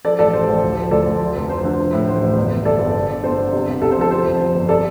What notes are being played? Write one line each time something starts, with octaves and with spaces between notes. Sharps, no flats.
F3 A4 D5
A1 A4 D5
A1 C5
A1
D2
F3
D2 A4 D5
D2
F3
F1
F3 C5
D3
F3
A2
A1 C5
A1
G1
G1
G1 A4 D5
G1
G1
D3
G1 C5
D3
C3
C2
C2 A4
C5
F3 A4
F2 C5
F2
F3
G1
C3 A4 D5